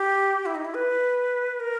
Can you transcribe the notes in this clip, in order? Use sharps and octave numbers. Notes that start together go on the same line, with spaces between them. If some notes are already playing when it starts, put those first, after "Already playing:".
Already playing: G4
E4
D#4
E4
B4
A#4